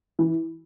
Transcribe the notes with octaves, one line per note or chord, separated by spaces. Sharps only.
E3